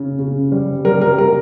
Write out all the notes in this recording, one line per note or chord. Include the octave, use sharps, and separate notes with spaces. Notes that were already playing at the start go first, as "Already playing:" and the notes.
Already playing: C#3
C#3
G3
G3 A#4
A#4
G3 A#4